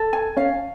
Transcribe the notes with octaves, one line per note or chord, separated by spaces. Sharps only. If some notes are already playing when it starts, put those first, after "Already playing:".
Already playing: A4
G#5
C#4 F5